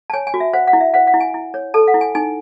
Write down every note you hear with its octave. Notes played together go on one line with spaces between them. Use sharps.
A5
C#5 G#5
G#5
F#4
E5
C5 F#5
F#5
E4
E5
C5 F#5
F#5
E4
G#5
E4
C#5
A4 A5
F#5
E4
G#5
D#4 G#5